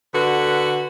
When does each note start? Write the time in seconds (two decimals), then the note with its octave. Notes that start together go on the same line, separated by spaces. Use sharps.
0.14 D3 F#4 B4